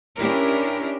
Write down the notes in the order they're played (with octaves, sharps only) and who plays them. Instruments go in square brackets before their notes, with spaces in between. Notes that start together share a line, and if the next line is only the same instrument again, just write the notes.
[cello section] C#4 D4 E4 G4 A#4